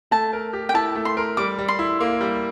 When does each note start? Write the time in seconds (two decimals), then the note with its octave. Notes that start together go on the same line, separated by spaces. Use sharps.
0.11 A3 A5
0.33 A#4
0.53 G4
0.69 G5
0.74 E4 A5
0.95 A3
1.05 C6
1.17 A#4
1.37 G3 D6
1.58 G3
1.68 C6
1.79 E4
2.00 A#3
2.21 G3